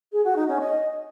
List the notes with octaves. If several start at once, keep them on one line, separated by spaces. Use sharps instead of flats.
G#4
F#4
D#4
C#4
D#5